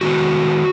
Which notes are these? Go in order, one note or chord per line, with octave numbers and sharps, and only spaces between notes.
D#3 G#3 B3 F#4